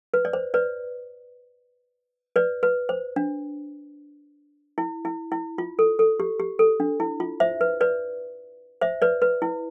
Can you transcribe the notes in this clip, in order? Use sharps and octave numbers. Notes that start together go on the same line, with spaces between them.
B4
D5
C5
B4 D5
B4 D5
B4
C5
D4
E4
E4
E4
F4
A4
A4
G4
G4
A4
D4
E4
F4
C5 E5
B4
B4 D5
C5 E5
B4 D5
B4
E4